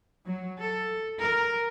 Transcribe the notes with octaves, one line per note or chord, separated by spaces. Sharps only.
F#3
A4
A#4